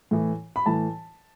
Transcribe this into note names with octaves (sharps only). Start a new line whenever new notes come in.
A2 E3
B5
A2 E3 A5